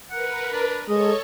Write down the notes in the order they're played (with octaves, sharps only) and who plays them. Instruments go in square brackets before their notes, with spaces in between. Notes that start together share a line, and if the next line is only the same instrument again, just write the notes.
[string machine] A#4 B4 [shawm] F#5
[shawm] D4
[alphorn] G#3 [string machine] A4 C#5 C#6 [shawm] D#5